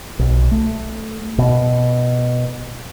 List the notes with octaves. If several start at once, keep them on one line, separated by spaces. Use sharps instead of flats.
B1
A3
B2